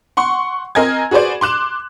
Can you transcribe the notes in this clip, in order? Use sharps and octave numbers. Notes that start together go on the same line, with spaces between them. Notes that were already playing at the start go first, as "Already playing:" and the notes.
F#5 C6 C#6
C4 A#4 D#5 G#5 G#6
F#4 G#4 B4 C5 D5
C6 D6 F#6 E7